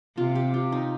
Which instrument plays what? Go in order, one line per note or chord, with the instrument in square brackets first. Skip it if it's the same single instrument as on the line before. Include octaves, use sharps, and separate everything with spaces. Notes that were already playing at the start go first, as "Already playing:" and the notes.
[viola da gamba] C3 [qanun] F4
[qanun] G4
F4
D#4